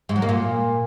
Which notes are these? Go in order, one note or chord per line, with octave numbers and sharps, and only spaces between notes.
G#2
F#3
A#3
A#2